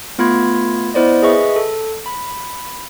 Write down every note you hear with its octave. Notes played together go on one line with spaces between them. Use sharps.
A3 B3 F4 B5 C6 G#6
B3 E4 C5 D5 D#5
G#4 B4 D#5 E5 C#6
A4
B5